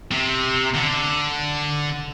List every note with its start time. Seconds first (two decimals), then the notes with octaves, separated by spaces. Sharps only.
0.11 C3
0.75 D3